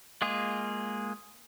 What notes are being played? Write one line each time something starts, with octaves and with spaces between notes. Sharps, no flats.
G#3 A#3 F4 G#4